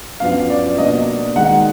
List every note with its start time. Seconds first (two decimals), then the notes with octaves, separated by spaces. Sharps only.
0.20 F#2 F3 B3 D4 F5
0.50 D5
0.78 B2 A#3 D4 D#5
1.36 D#3 G#3 D#4 F#5